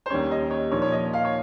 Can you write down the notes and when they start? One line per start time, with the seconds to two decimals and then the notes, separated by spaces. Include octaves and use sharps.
0.06 C5
0.10 D#2 D#3 G3 C#4 C#5
0.31 D#5
0.51 C#5
0.71 A#2 F3 A#3 D#4 C#5
0.82 C#5
0.92 D#5
1.13 F5
1.25 C#5